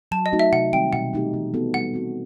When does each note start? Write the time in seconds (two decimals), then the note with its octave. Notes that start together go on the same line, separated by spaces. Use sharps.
0.12 F#3 A5
0.26 D#5
0.33 A3 D#4 F#4
0.39 E5
0.52 C3 F#5
0.72 D#3 G3 C4 G5
0.93 B2 F#5
1.13 A3 D#4 G4
1.34 E3
1.54 B3 D#4 F#4 A4
1.74 G3 F#5
1.94 C4 F#4